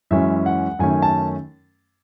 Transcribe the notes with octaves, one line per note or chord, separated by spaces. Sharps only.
F#2 E3 G#3 C#4 E5
F#5
F#2 D#3 A3 C#4 G#5
A5